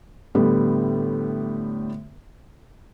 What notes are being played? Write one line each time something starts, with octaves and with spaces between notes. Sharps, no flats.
A2 D3 G3 B3